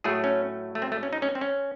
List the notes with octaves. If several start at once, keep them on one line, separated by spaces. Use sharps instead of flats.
A2 F#3 A3 G#4
C#4
A3
C4
A3
C#4
D#4
C#4
C4
C#4